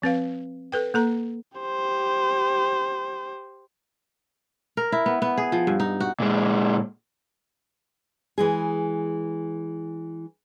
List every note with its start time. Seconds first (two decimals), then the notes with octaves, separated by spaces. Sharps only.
0.02 F3 C4 B4 F5
0.72 A4 B4 G5
0.94 A#3 A4 A#5
1.58 G4 C5
4.77 A#4
4.92 E4
5.06 B3
5.22 B3
5.37 G#4
5.52 F3
5.67 G2
5.80 D#4
6.00 F#4
6.20 A#2 G#3
8.38 E3 G#3 G#4